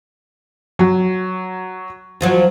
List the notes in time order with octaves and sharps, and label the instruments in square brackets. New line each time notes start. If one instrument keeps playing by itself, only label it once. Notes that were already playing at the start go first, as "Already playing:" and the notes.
[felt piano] F#3
[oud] D#2 F3 F#3